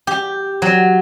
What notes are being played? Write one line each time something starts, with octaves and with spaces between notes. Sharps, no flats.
G4
F#3